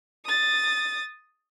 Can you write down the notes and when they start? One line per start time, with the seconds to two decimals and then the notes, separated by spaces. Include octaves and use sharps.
0.25 D#6 A6